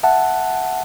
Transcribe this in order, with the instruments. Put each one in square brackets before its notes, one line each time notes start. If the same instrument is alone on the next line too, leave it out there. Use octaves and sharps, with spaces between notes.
[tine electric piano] E5 F#5 A5